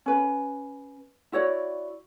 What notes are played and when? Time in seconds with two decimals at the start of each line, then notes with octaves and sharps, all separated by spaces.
0.06 C#4 B4
1.32 E4 F#4 C#5 D5